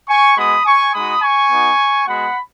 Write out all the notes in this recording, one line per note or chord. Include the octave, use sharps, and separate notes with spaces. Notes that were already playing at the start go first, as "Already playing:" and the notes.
G#5 C#6
G#3 B3 F#4 B5 D#6
G#5 C#6
G#3 D#4 F#4 B5 D#6
G#5 C#6
B3 D#4 F#4
G#3 B3 F#4 F#5 B5